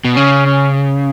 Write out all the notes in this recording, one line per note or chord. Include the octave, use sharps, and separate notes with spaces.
B2
C#3 C#4
C#4